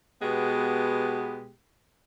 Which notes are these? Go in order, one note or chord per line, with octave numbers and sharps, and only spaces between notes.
B2 G#3 B3 G4